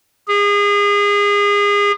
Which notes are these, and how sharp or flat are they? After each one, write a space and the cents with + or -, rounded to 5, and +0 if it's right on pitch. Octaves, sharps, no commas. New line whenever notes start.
G#4 -30